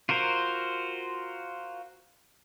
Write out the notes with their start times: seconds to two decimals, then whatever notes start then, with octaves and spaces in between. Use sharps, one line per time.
0.09 F4 F#4 A#4 C5